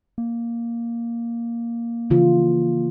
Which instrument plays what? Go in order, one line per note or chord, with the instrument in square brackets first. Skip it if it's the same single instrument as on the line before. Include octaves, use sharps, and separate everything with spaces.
[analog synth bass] A#3
[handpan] C#3 E3 F4